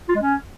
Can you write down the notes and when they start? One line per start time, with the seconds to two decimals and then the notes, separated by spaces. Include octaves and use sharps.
0.09 F4
0.15 G#3
0.22 C#4